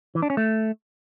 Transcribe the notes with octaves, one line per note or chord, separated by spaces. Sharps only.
E3
D4
C#4
A3